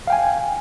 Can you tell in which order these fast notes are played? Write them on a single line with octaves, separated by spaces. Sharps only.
F5 G5 G#5